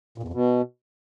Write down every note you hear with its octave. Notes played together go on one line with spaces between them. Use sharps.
A#2
E2
F2
B2